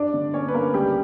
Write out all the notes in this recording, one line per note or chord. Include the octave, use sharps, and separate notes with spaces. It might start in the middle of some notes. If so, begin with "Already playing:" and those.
Already playing: G2 D4 D5
D3
A#3 C#4 C#5
B4
G2 A#3 A#4
C#2 G3 G4